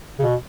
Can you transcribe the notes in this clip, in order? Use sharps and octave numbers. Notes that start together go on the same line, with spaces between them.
C#3
B2